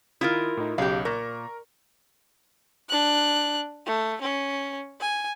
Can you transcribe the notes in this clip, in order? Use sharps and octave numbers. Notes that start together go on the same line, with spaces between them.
D#3 E4 F4 A#4 F5 D#6
A2 D#4
B1 C#3 F#3 G4 F5
A#2 A#4 A#5 C#6
D4 F#6
A3
C#4
G#5